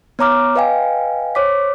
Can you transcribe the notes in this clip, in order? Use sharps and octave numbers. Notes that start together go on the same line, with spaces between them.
B3 C#5 A#5 D6 F6
B4 D#5 F5 G5 G#5
C5 C#5 D6 B6